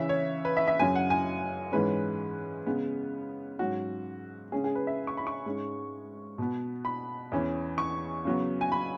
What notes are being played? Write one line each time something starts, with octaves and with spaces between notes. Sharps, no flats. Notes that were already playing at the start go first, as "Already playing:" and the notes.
Already playing: C#3 E3 C#4 E5
C#5
B4
E5
E5
F#2 C#3 F#3 G#5
F#5
G#5
G#2 E3 G#3 C#4 B4
C#3 G#3 B3
G#2 F#3 C#4 F#4
C#3 G#3 C#4 G#4
G#4
B4
E5
C#6
B5
C#6
G#2 G#3 C#4
B2 B3
B5
E2 E3 C#4
C#6
C#3 F#3 B3
G#5
B5